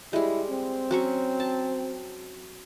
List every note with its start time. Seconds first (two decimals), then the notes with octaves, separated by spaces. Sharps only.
0.13 G3 G#3 E4
0.50 C4
0.91 F#3 C#4 C#6
1.40 A5